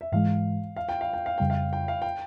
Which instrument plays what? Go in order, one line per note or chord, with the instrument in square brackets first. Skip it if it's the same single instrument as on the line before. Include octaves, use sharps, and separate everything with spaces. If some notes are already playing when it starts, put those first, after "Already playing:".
[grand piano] E5
[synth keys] G#2 E3 G#3 [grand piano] F5
[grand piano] F5
G5
F5
G5
F5
[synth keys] F2 C#3 G3 [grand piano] G5
[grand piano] F5
G5
F5
G5